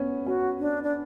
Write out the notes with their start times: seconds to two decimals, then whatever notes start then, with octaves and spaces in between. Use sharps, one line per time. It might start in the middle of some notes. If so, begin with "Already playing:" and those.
Already playing: B3 C#4
0.26 C#4 F#4
0.60 D4
0.83 D4